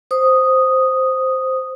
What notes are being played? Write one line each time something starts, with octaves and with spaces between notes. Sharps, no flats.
C5 D#6